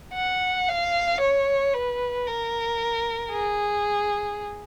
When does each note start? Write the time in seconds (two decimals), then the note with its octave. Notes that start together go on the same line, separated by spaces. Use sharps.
0.15 F#5
0.68 F5
1.20 C#5
1.74 B4
2.27 A#4
3.32 G#4